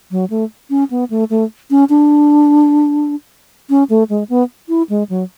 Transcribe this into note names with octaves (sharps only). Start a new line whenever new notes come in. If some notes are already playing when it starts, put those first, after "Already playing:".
F#3
A3
C#4
B3
A3
A3
C#4
D4
C#4
A3
G#3
B3
E4
G#3
F#3